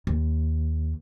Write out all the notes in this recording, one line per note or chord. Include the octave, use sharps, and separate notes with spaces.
D#2